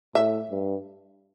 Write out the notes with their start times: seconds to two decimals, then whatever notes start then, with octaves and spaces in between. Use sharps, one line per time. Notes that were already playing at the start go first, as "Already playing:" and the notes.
0.15 A2 E5
0.51 G2